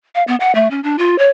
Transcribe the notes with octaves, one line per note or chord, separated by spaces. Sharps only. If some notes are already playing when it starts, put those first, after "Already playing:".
F5
B3
F#5
A3
C#4
D4
F4
C#5